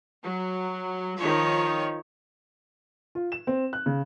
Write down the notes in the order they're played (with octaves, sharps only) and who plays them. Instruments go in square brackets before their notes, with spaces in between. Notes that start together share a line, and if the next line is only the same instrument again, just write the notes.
[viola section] F#3
D#3 F3 C#5
[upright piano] F4
E7
C4
F#6
C#3